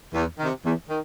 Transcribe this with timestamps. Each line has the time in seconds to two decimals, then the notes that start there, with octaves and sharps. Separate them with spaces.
0.14 E2
0.38 C3 D#3
0.64 E2
0.89 D#3